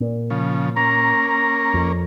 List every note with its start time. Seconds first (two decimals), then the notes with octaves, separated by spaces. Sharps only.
0.01 A#2
0.30 C#3 F3
0.76 A#3 C#4 A#5
1.29 A#5
1.74 F2